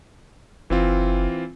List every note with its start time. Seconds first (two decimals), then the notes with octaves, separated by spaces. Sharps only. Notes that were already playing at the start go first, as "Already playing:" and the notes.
0.70 F#1 E3 C4 F4